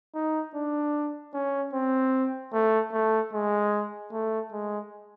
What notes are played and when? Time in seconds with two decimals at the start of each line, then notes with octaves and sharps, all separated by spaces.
0.14 D#4
0.55 D4
1.34 C#4
1.73 C4
2.53 A3
2.92 A3
3.33 G#3
4.12 A3
4.52 G#3